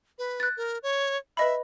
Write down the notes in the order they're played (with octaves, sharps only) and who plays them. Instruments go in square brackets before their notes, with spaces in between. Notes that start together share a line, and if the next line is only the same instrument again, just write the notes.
[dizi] B4
[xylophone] F#6 A6
[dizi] A#4
C#5
[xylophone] B4 D#5 B5 [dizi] E5